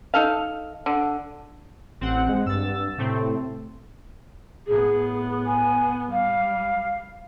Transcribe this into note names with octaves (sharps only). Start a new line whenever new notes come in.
D#4 A4 F5
D3
A1 C4 F#5
G#3
G2 E6 A6
A2 C3 A3 C4
A2 B3 G#4
G#5
G3 F5